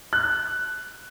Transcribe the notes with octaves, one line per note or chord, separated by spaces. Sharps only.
F#6